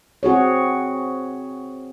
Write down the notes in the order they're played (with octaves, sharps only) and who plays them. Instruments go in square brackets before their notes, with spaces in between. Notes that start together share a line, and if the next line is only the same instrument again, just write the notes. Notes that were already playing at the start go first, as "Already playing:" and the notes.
[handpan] C4 F#4 G#4 C#5